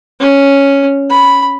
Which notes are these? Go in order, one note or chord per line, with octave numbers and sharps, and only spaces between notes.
C#4
B5